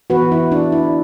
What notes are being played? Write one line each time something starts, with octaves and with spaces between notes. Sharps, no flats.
E3 B3 F#4 B4
E4
D4
E4